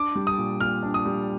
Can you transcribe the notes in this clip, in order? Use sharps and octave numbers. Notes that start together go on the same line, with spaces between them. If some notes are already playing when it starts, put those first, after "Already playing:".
Already playing: D4 D6
G3
D#6
A#2
A#2 F6
D4
D#6
G3